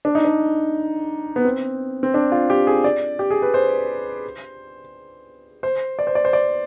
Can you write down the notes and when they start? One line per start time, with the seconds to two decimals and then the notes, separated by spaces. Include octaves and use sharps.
0.05 D4
0.15 D#4
0.25 D4
1.36 B3
1.45 C4
2.03 C4
2.14 D4
2.32 F4
2.50 G4
2.67 G#4
2.84 D5
3.19 G4
3.31 G#4
3.42 B4
3.54 C5
5.63 C5
5.99 D5
6.07 C5
6.15 D5
6.25 C5
6.33 D5